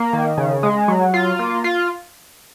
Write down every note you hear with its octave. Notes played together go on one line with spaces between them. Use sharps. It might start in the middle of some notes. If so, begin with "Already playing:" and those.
Already playing: A#3
D#3
C#3
G#3
F#3
F4
A#3
F4